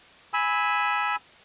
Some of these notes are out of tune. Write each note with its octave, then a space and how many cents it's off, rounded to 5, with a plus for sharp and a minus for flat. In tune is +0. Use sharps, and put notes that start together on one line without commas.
G#5 +0 B5 +0 E6 -20